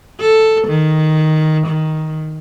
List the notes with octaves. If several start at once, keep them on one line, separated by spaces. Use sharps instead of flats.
A4
D#3
D#3